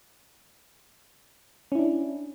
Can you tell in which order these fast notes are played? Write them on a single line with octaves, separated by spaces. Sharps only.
C#4 E4 D4